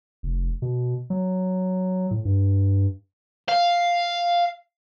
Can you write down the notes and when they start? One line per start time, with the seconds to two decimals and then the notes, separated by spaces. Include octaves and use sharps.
0.23 F1
0.62 B2
1.10 F#3
2.11 A2
2.25 G2
3.49 F5